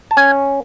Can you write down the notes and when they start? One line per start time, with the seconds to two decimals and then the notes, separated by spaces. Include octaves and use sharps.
0.11 A5
0.17 C#4 G#5